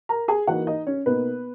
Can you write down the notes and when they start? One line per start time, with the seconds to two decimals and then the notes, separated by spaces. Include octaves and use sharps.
0.09 A#4 A#5
0.28 G#4 G#5
0.47 E3 A#3 D#4 F#4 F#5
0.67 D#4 D#5
0.87 C#4 C#5
1.06 B2 A#3 B3 D#4 B4